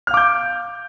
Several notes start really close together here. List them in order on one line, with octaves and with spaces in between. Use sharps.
F6 F5 D6 G6